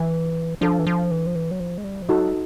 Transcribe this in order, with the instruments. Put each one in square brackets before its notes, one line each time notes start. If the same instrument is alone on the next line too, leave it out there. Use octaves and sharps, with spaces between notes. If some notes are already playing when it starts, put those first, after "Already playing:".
Already playing: [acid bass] E3
[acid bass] F3 [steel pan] D4 F4 A4
[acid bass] E3
F3
E3
F3
E3
F#3
F3
G#3
G3
F3
[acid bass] F#3 [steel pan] D#4 F#4 A4
[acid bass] G3